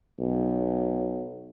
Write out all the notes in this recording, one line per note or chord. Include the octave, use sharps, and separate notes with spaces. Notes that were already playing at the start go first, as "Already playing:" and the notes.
B1